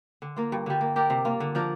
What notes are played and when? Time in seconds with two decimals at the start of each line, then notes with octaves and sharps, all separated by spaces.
0.22 D3
0.36 A#3 F4
0.52 G2
0.66 D3 G3
0.81 A#3
0.96 G4 A#4 D5
1.10 C3
1.25 A#3 F4
1.40 D3
1.55 F3 D4 A#4